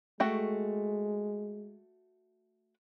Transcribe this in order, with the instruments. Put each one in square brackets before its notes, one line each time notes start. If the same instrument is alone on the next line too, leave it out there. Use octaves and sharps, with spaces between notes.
[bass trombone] G#3 [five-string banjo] A3 F#4 G5